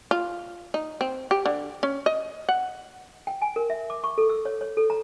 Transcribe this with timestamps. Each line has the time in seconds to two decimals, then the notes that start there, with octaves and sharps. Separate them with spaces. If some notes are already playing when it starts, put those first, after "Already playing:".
0.11 F4
0.74 D#4
1.01 C4
1.31 G4
1.46 D3
1.83 C#4
2.06 D#5
2.49 F#5
3.27 G5
3.42 G#5
3.56 A#4
3.70 E5
3.90 D6
4.04 C#6
4.18 A4
4.29 E6
4.45 C#5
4.61 C#5
4.77 A4
4.90 A#5